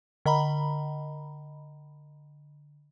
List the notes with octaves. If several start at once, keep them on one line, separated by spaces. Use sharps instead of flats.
D3 D#5 A#5 B5